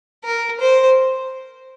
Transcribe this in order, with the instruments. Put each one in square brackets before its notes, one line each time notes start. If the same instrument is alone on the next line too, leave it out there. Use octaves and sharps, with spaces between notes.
[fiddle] A#4
C5